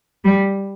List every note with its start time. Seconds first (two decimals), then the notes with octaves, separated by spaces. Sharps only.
0.24 G3